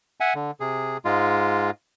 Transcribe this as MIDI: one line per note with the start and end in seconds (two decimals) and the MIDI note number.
0.20 0.34 76
0.20 0.34 78
0.20 0.34 80
0.35 0.51 50
0.60 0.97 48
0.60 0.97 68
1.05 1.71 44
1.05 1.71 56
1.05 1.71 65